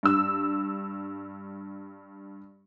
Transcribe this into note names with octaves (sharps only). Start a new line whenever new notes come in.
G2 E6